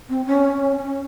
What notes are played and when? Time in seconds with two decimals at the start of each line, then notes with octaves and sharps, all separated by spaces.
0.09 C4
0.26 C#4
0.78 C#4